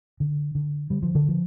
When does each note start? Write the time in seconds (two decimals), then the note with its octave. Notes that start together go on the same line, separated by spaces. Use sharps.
0.20 D3
0.55 D3
0.90 D3 G3
1.03 F3
1.15 D3
1.28 F3